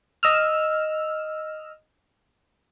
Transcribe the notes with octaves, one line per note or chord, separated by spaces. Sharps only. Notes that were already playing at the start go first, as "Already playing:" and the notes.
D#5 E6 F6